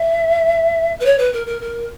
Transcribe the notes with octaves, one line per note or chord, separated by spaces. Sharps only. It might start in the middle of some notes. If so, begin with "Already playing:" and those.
Already playing: E5
B4
C#5
B4
A#4
A#4
A#4